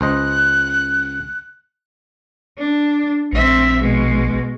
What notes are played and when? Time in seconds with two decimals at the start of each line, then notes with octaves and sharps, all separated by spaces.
0.01 C#2 C5 D#5 F#6
2.58 D4
3.33 A#1 C4 E5
3.82 B2 G#3